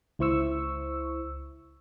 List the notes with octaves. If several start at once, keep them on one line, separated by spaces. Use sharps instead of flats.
C#2 E4 C5 C#6 E6